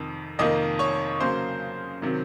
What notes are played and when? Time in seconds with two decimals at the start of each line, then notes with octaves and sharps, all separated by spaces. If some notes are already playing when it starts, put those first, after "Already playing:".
Already playing: F2 C3 D#3
0.39 F2 C3 D#3 A#3 D#5 D#6
0.79 C#5 C#6
1.20 C#3 F#3 A#3 C5 C6
2.02 C3 D#3 F#3